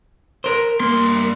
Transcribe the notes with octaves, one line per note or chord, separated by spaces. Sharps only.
A#4 C5
G2 A#3 C6